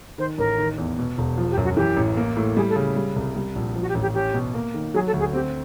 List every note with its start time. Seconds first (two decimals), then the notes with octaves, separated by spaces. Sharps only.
0.18 D#3 C5
0.38 A1 A#4
0.58 D#3
0.78 E2
0.98 B2
1.18 E1
1.38 F3
1.51 G4
1.57 F#2
1.64 F#4
1.76 E3 G4
1.97 A1
2.17 A#3
2.36 A2
2.56 G3 G#4
2.69 A4
2.76 C#3
2.96 G3
3.16 C2
3.36 G3
3.56 A#1
3.76 F3
3.81 F#4
3.89 G4
3.95 A1
4.02 G4
4.14 C#4 G4
4.34 B2
4.54 A#3
4.74 D#3
4.95 F#3 G#4
5.07 A4
5.14 D2
5.20 G#4
5.33 C4 G4